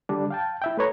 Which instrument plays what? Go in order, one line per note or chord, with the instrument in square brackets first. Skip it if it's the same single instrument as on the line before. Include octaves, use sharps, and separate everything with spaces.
[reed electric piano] D3 G3 D4
F5 G5 A5
E4 E5 G5
A3 B4 C#5 A#5